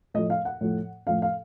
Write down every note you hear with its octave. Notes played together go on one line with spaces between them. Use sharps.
A2 F3 A3 D#5
F5
F#5
A2 F3 A3
A2 F3 A3 F5
F5